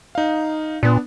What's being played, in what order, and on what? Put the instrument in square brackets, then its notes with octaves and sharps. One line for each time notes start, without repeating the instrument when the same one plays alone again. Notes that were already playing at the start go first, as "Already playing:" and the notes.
[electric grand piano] D#4 F5
[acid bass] A#2 [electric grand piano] B3 D4